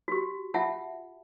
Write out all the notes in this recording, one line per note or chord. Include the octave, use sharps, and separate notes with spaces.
F#4 G4
F4 E5 F#5 A5